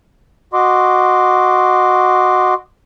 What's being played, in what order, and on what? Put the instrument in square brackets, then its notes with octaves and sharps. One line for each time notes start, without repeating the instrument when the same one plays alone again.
[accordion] F#4 D#5 C6 D6